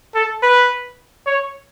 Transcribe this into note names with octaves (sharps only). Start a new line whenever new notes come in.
A4
B4
C#5